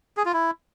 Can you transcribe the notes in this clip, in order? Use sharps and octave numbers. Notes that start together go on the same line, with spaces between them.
G#4
F4
E4